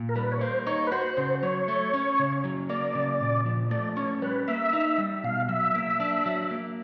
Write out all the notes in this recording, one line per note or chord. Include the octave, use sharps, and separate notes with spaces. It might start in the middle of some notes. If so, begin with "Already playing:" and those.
Already playing: A#2
A#4
G3 B4
C#5
A#3 C5
D#4 C#5
B4
F#4 C5
C#3 C5
F#3 C#5
A3
C#4
C#3
F#3
A#3 D5
C#3
A#2
F3
A3 D5
C#4 C#5
G3 B4
A#3 E5
D#4
G3
B2 F5
F#3 E5
A#3
D4
F#3
A#3